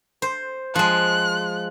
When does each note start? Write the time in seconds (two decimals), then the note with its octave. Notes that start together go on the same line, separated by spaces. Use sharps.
0.22 C5
0.75 F3 G#3 F#6